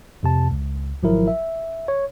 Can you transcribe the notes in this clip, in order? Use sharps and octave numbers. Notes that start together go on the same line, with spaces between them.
F2 C3 A5
C#2
G#1 F3 F#3 E4 A#4
E5
C#5